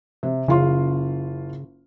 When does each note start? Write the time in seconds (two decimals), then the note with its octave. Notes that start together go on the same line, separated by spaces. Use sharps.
0.23 C3
0.48 F#1 C#3 F4 C6